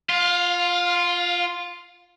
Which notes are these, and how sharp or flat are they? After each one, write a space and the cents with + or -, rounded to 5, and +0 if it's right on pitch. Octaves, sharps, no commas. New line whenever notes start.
F4 +0 F5 +25